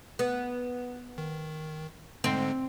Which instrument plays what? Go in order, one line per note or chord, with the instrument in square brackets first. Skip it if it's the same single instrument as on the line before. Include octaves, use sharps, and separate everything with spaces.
[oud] B3
[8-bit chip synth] D#3
[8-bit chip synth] G#2 D3 G#3 [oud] C4